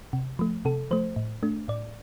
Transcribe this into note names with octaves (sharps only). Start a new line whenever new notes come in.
C3
F3 A3
C3 A4
F3 A3 C5
A2
A3 D4
A2 D5